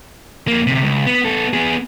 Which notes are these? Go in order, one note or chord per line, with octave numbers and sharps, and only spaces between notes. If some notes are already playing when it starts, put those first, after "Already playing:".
F2 A#3
D2 C3
C#2
B3
B3 A4
B3 G#4